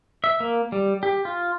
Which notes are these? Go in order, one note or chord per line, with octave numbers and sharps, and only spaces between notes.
E5
A#3
G3
G4
F4